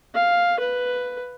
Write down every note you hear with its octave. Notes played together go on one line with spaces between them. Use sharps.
F5
B4